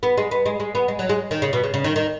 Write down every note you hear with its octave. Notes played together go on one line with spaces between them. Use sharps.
B3
G#3
B3
G#3
G#3
B3
G#3
F#3
G#3
D#3
C#3
B2
C#3
C#3
D#3
D#3